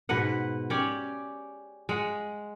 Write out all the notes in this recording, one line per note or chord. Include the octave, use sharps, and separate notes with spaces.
G#2 B2 B4 F#5
C#4 G4 C#5 D5
G#3 F#5